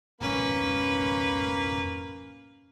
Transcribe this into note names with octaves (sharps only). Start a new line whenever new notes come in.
F2 G#2 B2 A#3 C#4 B4 B5